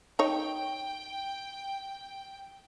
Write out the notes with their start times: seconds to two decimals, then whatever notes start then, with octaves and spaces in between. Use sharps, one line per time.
0.19 D#4 C#5 G5